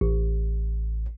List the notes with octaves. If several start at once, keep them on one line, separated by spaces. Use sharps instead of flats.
A1